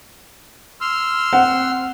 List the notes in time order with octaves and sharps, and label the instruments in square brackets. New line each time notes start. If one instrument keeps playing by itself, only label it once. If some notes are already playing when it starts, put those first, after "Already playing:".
[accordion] C6 E6 F6
[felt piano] C4 F#5